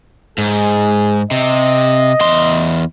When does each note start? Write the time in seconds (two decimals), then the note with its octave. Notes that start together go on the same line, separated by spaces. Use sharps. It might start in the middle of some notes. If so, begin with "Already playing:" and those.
0.38 G#2 G#4
1.31 C3 D#5
2.21 E2 C6